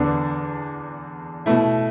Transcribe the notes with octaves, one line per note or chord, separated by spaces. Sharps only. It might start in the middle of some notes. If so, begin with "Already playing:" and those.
Already playing: E2 D3 B3 D4
B2 A3 E4